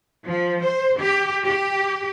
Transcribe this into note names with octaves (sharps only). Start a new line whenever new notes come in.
F3
C5
G4
G4